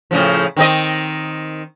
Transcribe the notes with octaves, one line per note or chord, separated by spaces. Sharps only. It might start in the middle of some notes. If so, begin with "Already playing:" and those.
A2 C#3 F3
D#3 C4 D#5